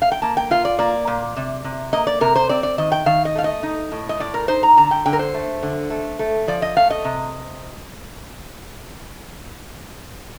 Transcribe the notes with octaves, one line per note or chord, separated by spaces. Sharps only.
F5
G5
A#3 A5
G5
F4 F5
D5
A#3 D5
A#2
C3
C3
A#3 D#5
D5
C3 A#4
C5
C4 D5
D5
D#3 D#5
G5
D#3 F5
D#5
A3 F5
D#5
D#4
A2
D#5
A2 D5
A#4
D#4 C5
A#5
D3 A#5
G5
D3 G5
A#4
C5
A3
D3
A3
A3
F3 D5
D#5
A3 F5
D#5
C3